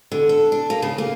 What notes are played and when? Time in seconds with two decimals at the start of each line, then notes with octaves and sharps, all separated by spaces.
0.12 D3
0.29 A4
0.52 D4
0.70 A#3
0.82 C#3
0.98 A#3